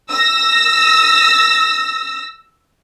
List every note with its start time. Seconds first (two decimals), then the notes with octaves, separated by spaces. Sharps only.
0.11 E6 A#6